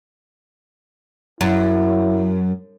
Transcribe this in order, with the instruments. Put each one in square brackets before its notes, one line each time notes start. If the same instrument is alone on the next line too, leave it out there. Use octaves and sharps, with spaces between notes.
[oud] F#2 [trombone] E4